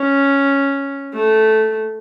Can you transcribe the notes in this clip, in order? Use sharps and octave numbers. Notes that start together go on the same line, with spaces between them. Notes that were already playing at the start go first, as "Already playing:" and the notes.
Already playing: C#4
A3